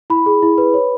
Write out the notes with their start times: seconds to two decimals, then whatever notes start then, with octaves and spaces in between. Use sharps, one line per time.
0.10 E4 B5
0.26 G#4
0.42 E4
0.58 B4
0.74 C#5